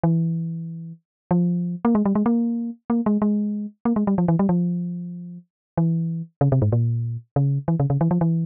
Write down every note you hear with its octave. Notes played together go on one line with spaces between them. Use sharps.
E3
F3
A#3
G#3
G3
G#3
A#3
A#3
G#3
G#3
A#3
G#3
G3
F3
E3
G3
F3
E3
C#3
C3
G#2
A#2
C#3
E3
C#3
C#3
E3
F3
E3